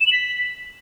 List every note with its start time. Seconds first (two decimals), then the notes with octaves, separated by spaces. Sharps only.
0.01 E7
0.07 F#7
0.13 B6